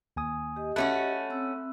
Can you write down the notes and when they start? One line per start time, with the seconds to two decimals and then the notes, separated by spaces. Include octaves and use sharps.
0.17 D#2 G#5 D#6
0.56 G4 D#5
0.76 A3 C#4 F#4 E5 B5 F#6
1.30 C4 E6